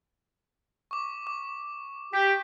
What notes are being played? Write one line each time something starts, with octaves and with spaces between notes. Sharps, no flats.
C#6 D6
D6
G4 B6